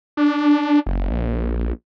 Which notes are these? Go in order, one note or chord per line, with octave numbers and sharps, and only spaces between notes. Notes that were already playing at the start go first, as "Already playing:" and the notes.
D4
F#1
A#1